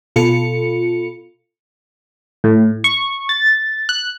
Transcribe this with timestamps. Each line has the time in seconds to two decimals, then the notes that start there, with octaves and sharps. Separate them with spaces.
0.16 B2 F4 A4 C#7
2.44 A2
2.84 C#6
3.29 A6
3.89 F#6